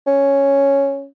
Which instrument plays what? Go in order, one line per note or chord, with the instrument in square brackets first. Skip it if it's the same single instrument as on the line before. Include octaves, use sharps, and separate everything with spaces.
[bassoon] C#4